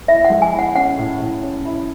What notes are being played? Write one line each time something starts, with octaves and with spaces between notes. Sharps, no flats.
E4 E5
F#5
G#3
G#5
E4
F#5
C#4 F#5
A2
A2
C#4
E4